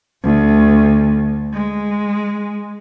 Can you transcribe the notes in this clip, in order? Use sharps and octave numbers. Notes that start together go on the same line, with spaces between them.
D2
G#3